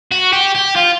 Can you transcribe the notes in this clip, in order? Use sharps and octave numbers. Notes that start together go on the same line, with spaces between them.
F#4
G4
G4
F4